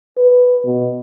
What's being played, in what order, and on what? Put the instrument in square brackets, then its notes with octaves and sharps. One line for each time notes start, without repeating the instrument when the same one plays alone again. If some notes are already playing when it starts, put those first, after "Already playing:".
[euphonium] B4
B2